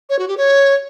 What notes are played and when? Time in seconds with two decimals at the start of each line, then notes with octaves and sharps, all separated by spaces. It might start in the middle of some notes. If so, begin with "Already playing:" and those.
0.10 C#5
0.19 F#4
0.28 G4
0.37 C#5